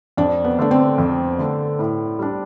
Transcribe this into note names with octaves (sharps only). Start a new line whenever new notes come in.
F2 D4
B3
D3 A3 D4
C4
F2
D3 A3
A2
G3 D4